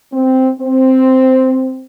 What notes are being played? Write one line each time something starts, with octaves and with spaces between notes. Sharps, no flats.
C4
C4